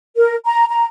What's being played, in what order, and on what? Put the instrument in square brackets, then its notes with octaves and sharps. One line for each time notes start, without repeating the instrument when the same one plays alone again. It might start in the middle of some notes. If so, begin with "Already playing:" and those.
[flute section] A#4
A#5
A#5